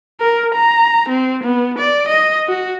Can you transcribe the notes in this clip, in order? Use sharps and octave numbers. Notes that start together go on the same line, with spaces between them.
A#4
A#5
C4
B3
D5
D#5
F#4